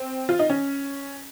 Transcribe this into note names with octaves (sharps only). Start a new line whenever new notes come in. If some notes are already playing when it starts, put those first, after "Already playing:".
Already playing: C4
F4
D#4
C#4